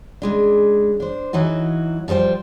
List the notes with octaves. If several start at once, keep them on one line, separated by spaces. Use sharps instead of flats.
C#3 G#3 D4
D4 C5
E3 F#3 D#4 F#4
F3 G3 A4 C5 G5